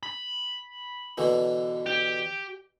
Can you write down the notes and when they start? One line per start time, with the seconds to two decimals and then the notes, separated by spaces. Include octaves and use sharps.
0.03 B5
1.18 B2 D3 E3
1.86 G4